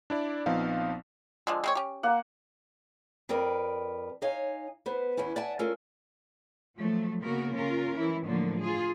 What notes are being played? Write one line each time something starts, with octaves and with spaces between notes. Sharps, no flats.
D4 E4 D5
A#1 F3 B3 C4 D#4 F5
D3 F3 G#3
G#3 C4 C#5
C#4 G4
A#3 F#5
F2 F3 C4 A#4 B4 D5
D#4 C#5 F5 G#5
B3 B4 C5
E2 B3 C#4 E4
D5 E5 F#5 G#5 A5
A3 C#4 F4 A4 A#4
F3 F#3 A3
C#3 A#3 B3 F#4 A#4
C#3 C#4 F4 A#4
E3 E4
A2 D3 F3 F#3 A#3
F4 G#4